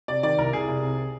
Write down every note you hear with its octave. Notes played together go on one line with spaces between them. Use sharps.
C3 D5
D#3 D5
C2 A#4
C2 G#4
C2
C3